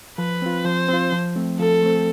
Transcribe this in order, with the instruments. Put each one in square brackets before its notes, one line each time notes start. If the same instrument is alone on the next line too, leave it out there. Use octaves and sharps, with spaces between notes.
[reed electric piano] F3 [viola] B4
[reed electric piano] C4 F4
[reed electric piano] F3 [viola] C5
[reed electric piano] C4 F4
F3
A3 C4
[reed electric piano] F3 [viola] A4
[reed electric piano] A3 C4